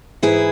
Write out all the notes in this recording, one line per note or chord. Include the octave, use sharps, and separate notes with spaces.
G#2 E3 E4 G#4